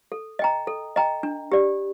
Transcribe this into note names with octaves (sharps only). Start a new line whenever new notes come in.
A4
D#5 G5 A#5
A4
D#5 G5 A#5
D4
G4 D5